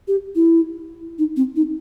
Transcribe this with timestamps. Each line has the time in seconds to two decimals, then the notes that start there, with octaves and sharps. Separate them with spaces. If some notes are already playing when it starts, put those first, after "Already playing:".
0.08 G4
0.35 E4
1.19 D#4
1.37 C4
1.56 D#4